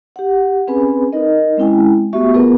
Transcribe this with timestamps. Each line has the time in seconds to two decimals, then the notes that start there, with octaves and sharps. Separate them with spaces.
0.16 G4 F#5
0.67 C4 C#4 G#4 B4 G#5 B5
1.13 D#4 A#4 D#5
1.57 G#3 C4 C#4 E4 G5 G#5
2.13 A3 B3 F#4 G4 E5 C#6
2.34 B3 F4 G#4 A#4 B4